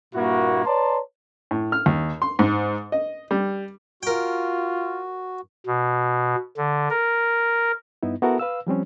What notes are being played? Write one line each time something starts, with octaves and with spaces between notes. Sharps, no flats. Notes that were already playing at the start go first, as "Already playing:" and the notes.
G2 A#2 A#3 E4 F#4
B4 C#5 D5 A5 A#5 C6
A2
F6
D#2
C6
G#2
D#5
G3
F4 F#4 A#4 G5
B2
D3
A#4
G2 B3 D#4 E4
B3 E4 F#4 A4 A#4 E5
B4 F5 E6
F3 G3 C4 C#4